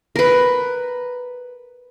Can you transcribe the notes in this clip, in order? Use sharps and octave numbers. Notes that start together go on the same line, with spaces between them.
A#4 B4